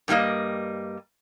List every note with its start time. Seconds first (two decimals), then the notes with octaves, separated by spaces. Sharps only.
0.08 G2 D#3 G3 A#3 D#5